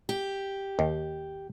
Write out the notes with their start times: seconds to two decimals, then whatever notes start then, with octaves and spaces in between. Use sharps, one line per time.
0.09 G4
0.79 D#2